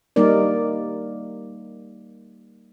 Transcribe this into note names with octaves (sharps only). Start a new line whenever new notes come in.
G3 A#3 D#4 A#4 D5